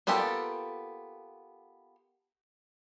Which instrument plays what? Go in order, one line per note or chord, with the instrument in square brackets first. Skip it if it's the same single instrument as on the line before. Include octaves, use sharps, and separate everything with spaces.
[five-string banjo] A#3 B3 F4 G4 A4